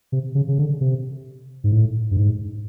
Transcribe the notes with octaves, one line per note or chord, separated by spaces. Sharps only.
C3
C#3
C#3
D3
C3
G#2
A2
G2
G#2